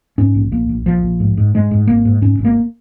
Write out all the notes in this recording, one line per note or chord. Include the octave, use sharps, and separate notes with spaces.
G#2 C#4
A#1
A#1 A#3
A#1
A#1 F3
A#1
G#2
G#2
G#2 G#3
G#2
G#1 A#3
G#2
G#2 C#4
G#1
A#3